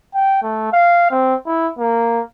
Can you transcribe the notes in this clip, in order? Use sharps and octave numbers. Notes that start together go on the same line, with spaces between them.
G5
A3
F5
C4
E4
A#3